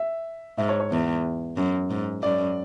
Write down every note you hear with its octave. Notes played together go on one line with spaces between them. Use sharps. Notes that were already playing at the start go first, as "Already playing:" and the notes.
Already playing: E5
G#2 E5
C#5
C#5
E2
F#2
G#2
F#2 D5